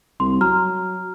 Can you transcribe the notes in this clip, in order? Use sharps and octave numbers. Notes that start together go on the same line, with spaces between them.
C2 C6
F#3 A#5 F6